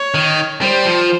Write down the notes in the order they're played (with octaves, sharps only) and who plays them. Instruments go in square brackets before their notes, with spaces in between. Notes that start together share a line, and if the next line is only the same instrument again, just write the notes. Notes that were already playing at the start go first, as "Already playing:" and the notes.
Already playing: [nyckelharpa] C#5
[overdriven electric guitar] D#3
[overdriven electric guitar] G3 [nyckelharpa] C5
[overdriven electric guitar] F3